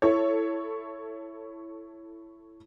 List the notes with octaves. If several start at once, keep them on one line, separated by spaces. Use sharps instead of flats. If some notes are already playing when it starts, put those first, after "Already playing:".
E4 A4 C#5